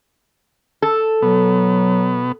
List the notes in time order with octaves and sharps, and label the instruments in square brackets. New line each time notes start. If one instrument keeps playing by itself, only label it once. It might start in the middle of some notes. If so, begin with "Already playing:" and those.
[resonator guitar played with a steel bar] A4
[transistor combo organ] B2 B3 [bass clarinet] F#3